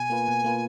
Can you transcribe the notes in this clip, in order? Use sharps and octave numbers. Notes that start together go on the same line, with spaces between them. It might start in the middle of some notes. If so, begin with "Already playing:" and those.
Already playing: B2 G#5
A#3 F4 B4
B2
A#3 F4 B4